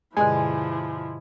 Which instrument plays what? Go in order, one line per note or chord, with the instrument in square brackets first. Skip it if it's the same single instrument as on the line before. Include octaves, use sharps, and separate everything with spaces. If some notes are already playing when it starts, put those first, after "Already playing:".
[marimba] G2 B2 D3 [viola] F3 E4 [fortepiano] G#3 [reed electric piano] G#5